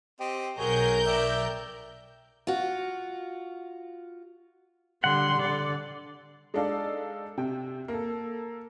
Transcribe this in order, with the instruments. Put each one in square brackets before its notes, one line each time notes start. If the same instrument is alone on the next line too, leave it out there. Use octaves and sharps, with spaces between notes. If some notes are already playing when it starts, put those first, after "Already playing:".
[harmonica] C4 G4 D#5
[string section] B1 A#4 G6 [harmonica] F#3 G#4 C#5
[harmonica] D5 E5 G5
[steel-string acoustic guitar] F4 F#4
[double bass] D3 G3 [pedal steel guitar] F#5 [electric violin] C6
[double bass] D3 [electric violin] D5
[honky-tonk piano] G#3 D4 D#4 A4 D5 F5
C3 G5
A#3 A4